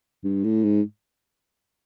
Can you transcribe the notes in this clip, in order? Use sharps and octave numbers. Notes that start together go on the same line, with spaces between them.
G2
A2
G#2